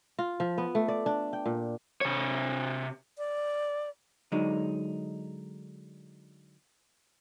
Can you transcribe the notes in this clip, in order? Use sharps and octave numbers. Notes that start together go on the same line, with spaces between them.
F4
F3
B3
A3
D5
D4
G5
A#2
C3 C#5
D5
D3 F#3 G#3 D#4